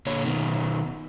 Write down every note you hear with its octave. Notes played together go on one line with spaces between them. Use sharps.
A#2 D3 C#5
B2 D#3